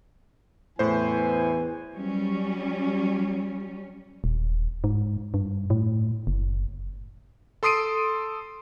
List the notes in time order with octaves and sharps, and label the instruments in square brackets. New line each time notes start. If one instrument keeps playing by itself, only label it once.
[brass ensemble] E2 E3 G#5 [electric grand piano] A2 C5
[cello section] F#3 G3 C#4
[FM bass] D#1
G#2
G2
A2
F#1
[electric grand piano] A4 C6 D#6 C7 D7 D#7